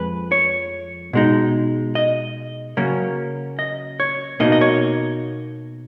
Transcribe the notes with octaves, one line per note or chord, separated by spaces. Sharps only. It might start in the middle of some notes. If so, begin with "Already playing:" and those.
Already playing: F2 F3 G#3 B4
C#5
B2 G#3 D#4
D#5
C#3 F#3 A#3 C#4
D#5
C#5
B2 A#3 D#4 D#5
D#5
C#5